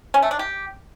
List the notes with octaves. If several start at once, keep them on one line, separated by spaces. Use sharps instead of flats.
C#4
A3
D4
G4